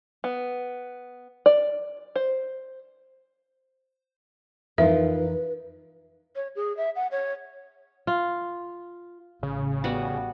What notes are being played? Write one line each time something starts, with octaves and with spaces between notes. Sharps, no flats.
B3
D5
C5
F2 E3 D#4 F4 A#4 B4 E5
C#5
G#4
E5
F#5
C#5
F4
A1 C#3
G3 B3 F#4